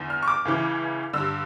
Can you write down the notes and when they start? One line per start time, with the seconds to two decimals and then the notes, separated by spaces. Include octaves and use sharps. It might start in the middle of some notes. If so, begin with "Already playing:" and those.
Already playing: E2 D3
0.10 F6
0.23 C#6
0.28 D6
0.45 C#2 C#3 E3
1.13 G2 D3 E6